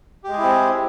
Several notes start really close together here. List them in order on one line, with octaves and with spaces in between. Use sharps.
G4 G#3 G#4 E4 C4